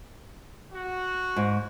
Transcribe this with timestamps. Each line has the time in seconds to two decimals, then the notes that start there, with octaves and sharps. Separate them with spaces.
0.72 F#4
1.36 G#2